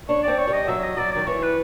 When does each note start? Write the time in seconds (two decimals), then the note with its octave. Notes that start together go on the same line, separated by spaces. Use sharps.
0.08 D4 C#5
0.23 C4 D5
0.38 C#5
0.48 G3
0.53 D#5
0.67 F#3 E5
0.83 D#5
0.97 F#3 D5
1.12 D#3 D5
1.27 E3 C#5
1.42 B4